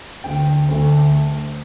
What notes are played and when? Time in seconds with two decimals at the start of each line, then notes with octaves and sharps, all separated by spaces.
0.24 D2 D3 A3 G5
0.68 D2 D3 A3